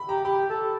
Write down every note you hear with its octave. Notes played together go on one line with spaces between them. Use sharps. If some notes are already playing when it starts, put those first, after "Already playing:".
Already playing: B5
G4 A#5
G4 B5
A4